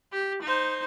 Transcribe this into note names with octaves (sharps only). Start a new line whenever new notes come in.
G4
D#4 C5